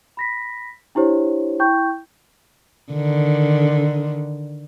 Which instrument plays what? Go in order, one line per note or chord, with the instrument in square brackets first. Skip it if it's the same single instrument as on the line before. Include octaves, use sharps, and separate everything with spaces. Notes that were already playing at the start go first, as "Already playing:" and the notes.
[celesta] B5 A#6 B6
D4 E4 G4 C5 C#5
E4 G5 C#6 G6
[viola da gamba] D3 D#3